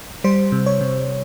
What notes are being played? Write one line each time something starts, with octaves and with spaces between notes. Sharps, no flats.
G3 C5
C3
C#5
C3